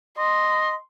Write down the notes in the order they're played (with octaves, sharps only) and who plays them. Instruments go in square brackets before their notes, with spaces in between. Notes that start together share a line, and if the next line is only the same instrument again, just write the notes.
[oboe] D#5 [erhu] C6